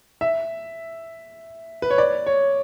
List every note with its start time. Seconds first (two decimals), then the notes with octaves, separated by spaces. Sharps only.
0.21 E5
1.82 B4
1.90 C#5
1.98 D5
2.26 C#5